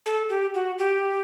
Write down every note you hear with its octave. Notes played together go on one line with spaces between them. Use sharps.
A4
G4
F#4
G4